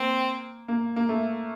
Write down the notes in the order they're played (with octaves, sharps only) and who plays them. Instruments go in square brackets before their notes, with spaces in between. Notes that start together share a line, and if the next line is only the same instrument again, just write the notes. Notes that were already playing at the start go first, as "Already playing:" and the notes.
Already playing: [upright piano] A#3 [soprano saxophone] C4
[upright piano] A#3
A#3
A3